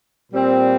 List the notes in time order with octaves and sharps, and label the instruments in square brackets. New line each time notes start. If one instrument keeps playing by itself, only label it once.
[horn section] A#2 G3 C4